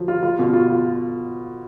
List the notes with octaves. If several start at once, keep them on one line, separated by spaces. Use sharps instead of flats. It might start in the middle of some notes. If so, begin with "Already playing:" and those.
Already playing: F3 F#3
F4
F4
B2
F4
F4